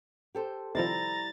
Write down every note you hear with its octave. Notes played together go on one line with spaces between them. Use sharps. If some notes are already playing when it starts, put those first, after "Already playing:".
G4 A4 C5
C3 D#3 F3 G3 E4 C5 A#5 A6